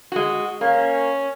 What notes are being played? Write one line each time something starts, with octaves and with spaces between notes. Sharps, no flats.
G#3 F#4
A#3 C#4